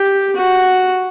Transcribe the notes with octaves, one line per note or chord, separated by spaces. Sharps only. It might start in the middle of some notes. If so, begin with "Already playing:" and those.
Already playing: G4
F#4